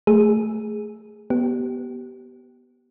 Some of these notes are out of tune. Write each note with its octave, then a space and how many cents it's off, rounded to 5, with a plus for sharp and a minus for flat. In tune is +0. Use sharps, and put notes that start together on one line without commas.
A3 +0 G#4 +0
B3 -10 G4 -25